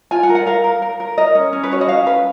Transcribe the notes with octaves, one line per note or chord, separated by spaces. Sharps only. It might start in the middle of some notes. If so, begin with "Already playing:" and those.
F4 G#5
F#5
A#4
F#5
A#4 F5
A#4
A#4
A#4
A#4 D#5
C#4
C#4
B4
F#4 C#5
D#5
C#4 F5
B4